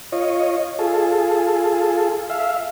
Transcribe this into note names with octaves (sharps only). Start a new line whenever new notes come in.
F4 C#5 D#5
F4 G#4 A4
E5 F5